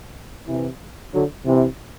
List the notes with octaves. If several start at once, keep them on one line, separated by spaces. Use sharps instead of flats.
C3 E3
D3 F#3
C3 E3